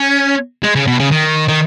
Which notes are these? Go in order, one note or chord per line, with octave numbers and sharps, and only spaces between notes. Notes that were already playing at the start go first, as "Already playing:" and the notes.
Already playing: C#4
G#3
C#3
B2
C#3
D#3
D#3